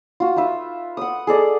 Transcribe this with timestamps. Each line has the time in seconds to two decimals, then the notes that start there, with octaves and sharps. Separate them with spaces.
0.20 F4 F#4
0.36 D#4 F4 B4 E5
0.97 F#5 D#6
1.27 G#4 A4 D5 D#5